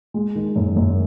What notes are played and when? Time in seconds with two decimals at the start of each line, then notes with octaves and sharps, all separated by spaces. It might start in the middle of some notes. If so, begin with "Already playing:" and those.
0.14 G#3
0.35 D#3
0.56 F#2
0.77 F#2